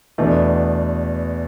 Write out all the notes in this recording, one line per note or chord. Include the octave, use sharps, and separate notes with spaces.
E2 B2 A3 D4